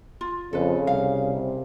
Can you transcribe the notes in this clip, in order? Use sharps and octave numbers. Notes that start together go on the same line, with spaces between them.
F4
F2 C#3 A4 B4
C2 F5
C3